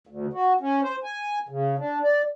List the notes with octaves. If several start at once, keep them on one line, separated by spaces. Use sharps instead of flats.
D2
F#4
C#4
C5
G#5
C#3
D4
D5